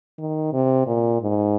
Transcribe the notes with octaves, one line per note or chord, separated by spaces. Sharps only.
D#3
C3
A#2
G#2